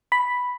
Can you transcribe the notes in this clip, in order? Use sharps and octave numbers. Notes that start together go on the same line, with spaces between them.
B5